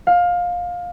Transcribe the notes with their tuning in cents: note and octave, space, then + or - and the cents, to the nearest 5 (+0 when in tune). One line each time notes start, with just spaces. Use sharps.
F5 +20